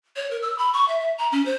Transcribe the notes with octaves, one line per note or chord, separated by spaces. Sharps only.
C#5
A#4
E6
B5
C#6
E5
E5
A#5
C#4
C5